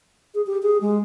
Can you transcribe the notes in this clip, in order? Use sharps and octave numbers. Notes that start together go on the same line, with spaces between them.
G#4
G4
G#4
G#3